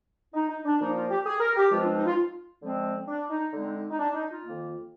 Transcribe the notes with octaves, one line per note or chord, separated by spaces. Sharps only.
D#4
D#4
D4
A#2 F3 A#3 D#4
F4
G4
G#4
A#4
G4
G2 F3 G#3 C4 F4
D4
D#4
F4
D3 F3 G#3 C4
D4
D#4
D3 G#3 C4 D#4
D#4
D#4
D4
D#4
F4
F2 D#3 A#3